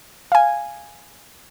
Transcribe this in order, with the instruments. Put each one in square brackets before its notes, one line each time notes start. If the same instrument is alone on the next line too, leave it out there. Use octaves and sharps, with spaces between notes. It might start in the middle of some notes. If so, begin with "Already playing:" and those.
[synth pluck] F5 G#5